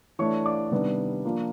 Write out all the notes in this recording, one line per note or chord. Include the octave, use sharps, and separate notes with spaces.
E3 A3 D4 C#5 C#6
D5 D6
C3 D#3 G3 B3 D4
F3 A#3 D4 F4